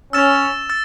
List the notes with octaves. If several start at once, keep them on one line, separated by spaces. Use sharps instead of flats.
C#4 E6 A6 E7
E6 A6